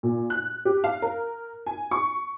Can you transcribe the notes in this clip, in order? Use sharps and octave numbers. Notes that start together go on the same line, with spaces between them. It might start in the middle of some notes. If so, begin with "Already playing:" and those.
A#2
F#6
G4
F5
A#4
G#5
C#6